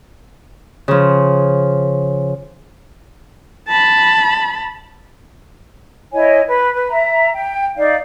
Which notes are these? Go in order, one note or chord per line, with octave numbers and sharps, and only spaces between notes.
C#3 F3
A5 B5
E4 C#5 D#5 G#5
B4
B4
E5 A#5
G5
D#4 D5 F5